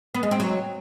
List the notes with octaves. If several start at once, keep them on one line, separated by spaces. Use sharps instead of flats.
B3
G#3
C4
F#3